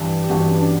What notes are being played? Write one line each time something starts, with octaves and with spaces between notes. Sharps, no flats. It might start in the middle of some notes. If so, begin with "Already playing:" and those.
Already playing: G2 E3 G4
G4
G2 E3 F#4
B3
C#4
D4